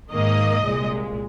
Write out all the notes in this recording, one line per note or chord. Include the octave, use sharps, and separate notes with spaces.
G#2 D#3 A#3 D#5
C2 A#2 G#3